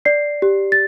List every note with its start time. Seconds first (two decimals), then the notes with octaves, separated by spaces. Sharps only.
0.05 D5 C7
0.42 G4
0.72 A6